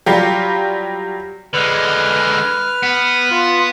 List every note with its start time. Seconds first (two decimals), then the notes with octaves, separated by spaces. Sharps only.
0.06 F#3 G3 F4 G4
1.54 D3 G#3 B4 F6
2.83 B3
3.31 F4